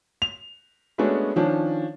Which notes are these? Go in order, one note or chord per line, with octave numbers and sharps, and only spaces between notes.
F7
G#3 A3 B3 C#4 D4 F#4
D#3 F3 C#4 D4